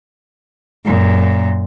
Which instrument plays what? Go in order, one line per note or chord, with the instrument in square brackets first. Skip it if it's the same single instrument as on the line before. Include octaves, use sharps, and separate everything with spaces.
[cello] F#2 A#2